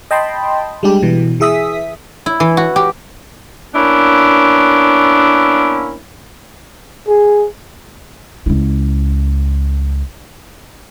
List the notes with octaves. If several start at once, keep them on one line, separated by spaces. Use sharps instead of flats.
D#5 G5 A5 B5 C6
G3 G#3 D4 G4
B2 E3
E3 G#4 E5 D#6 B6
E4
E3
F#4
G4
A#3 B3 C#4 D4 E4
G#4
C#2 E4